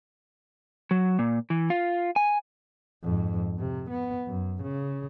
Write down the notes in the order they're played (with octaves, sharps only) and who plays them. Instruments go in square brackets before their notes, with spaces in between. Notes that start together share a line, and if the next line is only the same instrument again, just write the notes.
[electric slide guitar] F#3
A#2
E3
F4
G#5
[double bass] F2 G#2
C3
B3
F#2
C#3